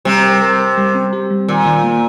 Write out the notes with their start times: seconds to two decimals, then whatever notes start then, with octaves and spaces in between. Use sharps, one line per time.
0.05 C3 G3
0.24 A#4
0.41 A#4
0.59 A#4
0.77 G3
0.95 C4
1.13 G4
1.31 G3
1.48 A#2 D#3
1.66 D#3
1.84 A#3